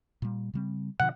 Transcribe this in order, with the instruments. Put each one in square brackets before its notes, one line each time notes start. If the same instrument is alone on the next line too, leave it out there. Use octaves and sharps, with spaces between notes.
[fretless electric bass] A#2 G3
C#3 G3 C4
[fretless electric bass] B2 D3 F3 [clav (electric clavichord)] F#5